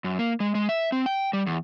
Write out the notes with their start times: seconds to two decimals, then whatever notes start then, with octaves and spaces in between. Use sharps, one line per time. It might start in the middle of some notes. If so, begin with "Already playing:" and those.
0.04 F#2
0.19 A#3
0.40 G#3
0.55 G#3
0.69 E5
0.92 C4
1.06 G5
1.33 G3
1.47 E2